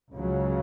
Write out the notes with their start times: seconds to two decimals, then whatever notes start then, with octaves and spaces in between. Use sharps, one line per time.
0.12 C#2 C#3 F#3